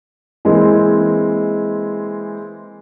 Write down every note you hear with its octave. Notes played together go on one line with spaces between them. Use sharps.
E3 G#3 A#3 C4